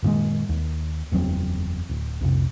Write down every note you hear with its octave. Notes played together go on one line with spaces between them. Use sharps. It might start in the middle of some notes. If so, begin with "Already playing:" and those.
F#2 A#2 D#3 G#3
D#2
F#1 E2 F#3 C4
D1
B1 F2 C3